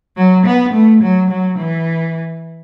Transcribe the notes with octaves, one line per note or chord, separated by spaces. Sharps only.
F#3
B3
A3
F#3
F#3
E3